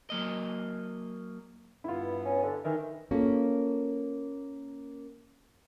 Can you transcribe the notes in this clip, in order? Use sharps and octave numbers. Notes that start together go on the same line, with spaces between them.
F#3 A#3 D#5
G2 B3 E4 F4
C#4
D3
D#3 E3 A#4
A#3 C#4 F4 A4